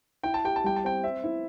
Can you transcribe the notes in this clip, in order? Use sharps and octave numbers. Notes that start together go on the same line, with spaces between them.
E4 G5
A5
G4 G5
A5
G3 G5
A5
C4 G5
C4 E5
E4